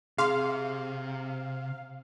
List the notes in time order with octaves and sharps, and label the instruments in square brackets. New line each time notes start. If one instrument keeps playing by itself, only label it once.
[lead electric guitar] C3 [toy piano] G#4 C6 [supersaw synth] F5